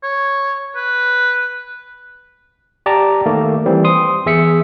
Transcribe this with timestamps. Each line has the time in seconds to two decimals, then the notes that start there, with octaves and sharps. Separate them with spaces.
0.03 C#5
0.76 B4
2.86 G4 D5 A5 A#5 D6
3.26 D#3 A3 A#3
3.66 E3 G3 C4
3.84 C6 D#6
4.26 E2 G#4 E5 B6 C#7